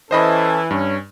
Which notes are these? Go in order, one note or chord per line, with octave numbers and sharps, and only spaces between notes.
E3 C#4 A4 C5 D#5 B5
G2 C#4